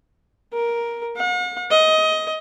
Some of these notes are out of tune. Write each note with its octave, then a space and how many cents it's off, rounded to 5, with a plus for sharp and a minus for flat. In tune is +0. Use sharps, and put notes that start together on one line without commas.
A#4 +10
F#5 -45
D#5 +20